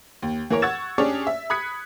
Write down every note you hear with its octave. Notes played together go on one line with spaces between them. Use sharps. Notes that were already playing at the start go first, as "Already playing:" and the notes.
D#2
E3 A#3 A#4 C#5
F#5 C#6 E6 G#6 A6 E7
C#4 D4 G4 G#4 C#5 D5
E5
B5 D#6 F#6 G#6 B6 C#7